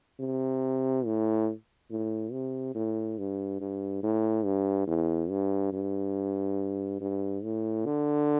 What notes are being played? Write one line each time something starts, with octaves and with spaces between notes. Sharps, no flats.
C3
A2
A2
C3
A2
G2
G2
A2
G2
E2
G2
G2
G2
A2
D3